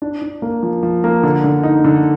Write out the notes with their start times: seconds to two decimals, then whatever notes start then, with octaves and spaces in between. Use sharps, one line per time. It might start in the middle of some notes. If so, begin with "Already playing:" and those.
0.02 D4
0.22 D4
0.42 A#3
0.63 F3
0.83 F3
1.04 A#3
1.23 D3
1.44 D3
1.63 D#4
1.84 D3